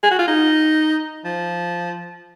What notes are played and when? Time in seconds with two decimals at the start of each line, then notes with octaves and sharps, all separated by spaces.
0.03 G#4
0.11 F#4
0.19 F4
0.27 D#4
1.24 F3